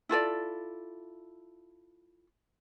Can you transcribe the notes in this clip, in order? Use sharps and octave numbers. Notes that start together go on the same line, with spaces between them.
E4 F4 A4 D5